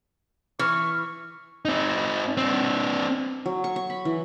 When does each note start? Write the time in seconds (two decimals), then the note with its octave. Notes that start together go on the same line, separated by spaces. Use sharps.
0.59 E3 C#6 F6
1.65 C4 D#4
2.37 C4 D4
3.46 F#3
3.64 C#6
3.76 C#6
3.90 B5
4.05 E3